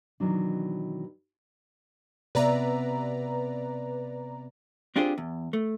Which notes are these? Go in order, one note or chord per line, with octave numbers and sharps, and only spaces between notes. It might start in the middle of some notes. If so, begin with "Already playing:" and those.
B2 D#3 E3 F#3 D4
C3 B3 B4 D5 E5 A#5
C4 D4 F4 G4 G#4 C5
E2
A3